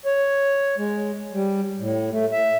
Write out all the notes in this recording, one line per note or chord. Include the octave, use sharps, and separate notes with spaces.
C#5
G#3
G3
A2
A3
E5